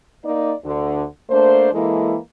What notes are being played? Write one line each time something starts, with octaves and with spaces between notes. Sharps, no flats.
A#3 D#4 D5
D2 D3
A3 A#3 D4 C5
E3 G#3 A#3 E4 A4